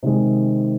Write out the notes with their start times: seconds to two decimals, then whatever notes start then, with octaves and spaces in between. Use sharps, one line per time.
0.03 C3 D#3 G#3